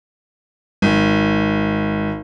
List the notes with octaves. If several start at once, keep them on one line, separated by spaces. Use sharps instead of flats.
G#1